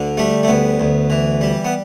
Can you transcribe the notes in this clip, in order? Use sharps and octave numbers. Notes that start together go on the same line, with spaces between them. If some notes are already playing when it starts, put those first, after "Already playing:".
Already playing: D2 D3
G3 A3
A3
D2 B3
D2
E3
G3
B3